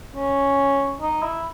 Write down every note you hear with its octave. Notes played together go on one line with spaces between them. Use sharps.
C#4
D#4
E4